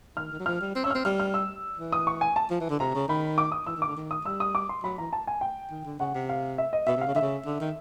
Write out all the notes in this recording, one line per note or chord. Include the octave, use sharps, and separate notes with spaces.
D#3 F6
D#3
F#3
F3 F6
G3
C4
C#4 E6
C4 F6
G3 F6
F6
E6
E3
D#6
C#6
G#5
A5
F3
E3
D3
C3 A#5
C#3
D#3 B5
D6
D#6
E3 E6
D#3
D3 D6
D#3
D#6
G3 E6
D#6
D6
C6
F#3 B5
E3 A#5
A5
G#5
G5
D#3
D3
C#3 F#5
C3
F5
E5
D#5
B2 E5
C3
F5
C#3
D3 E5
C#3
D3
D#3